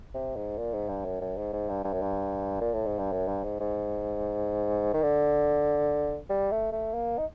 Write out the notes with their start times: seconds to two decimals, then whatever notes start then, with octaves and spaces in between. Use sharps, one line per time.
0.14 C3
0.36 G#2
0.58 A#2
0.74 G#2
0.89 G2
1.05 F#2
1.21 F#2
1.37 G#2
1.53 G#2
1.69 G2
1.84 G2
1.93 F#2
2.02 G2
2.61 A#2
2.74 A2
2.86 G#2
2.98 G2
3.12 F#2
3.28 G2
3.44 G#2
3.60 G#2
4.94 D#3
5.03 D3
6.30 G3
6.52 A3
6.72 A3
6.94 A#3
7.18 D#4